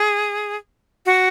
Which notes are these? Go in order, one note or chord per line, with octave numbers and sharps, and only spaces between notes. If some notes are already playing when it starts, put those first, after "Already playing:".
Already playing: G#4
F#4